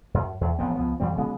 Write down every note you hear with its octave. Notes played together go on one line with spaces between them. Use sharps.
F#2
E2
A1 F3 B3 C4
C#2 F3 B3
F2 E3 G3 C4
C#3 F#3 G#3 B3